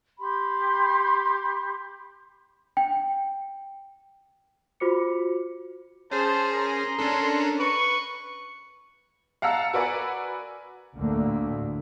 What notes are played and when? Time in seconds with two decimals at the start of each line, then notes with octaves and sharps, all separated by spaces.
0.20 G4 B5 C6
2.77 G5
4.80 F4 F#4 C5 D6 C#7
6.11 C#4 G#4 C5 A5
6.53 A#4 C6
6.99 C#4 D4 A4
7.60 B4 C#6
9.42 F5 F#5 A5 A#5 E6 C#7
9.74 F#4 A#4 B4 D5 G#5
10.98 D2 A2 D3 A3 A#3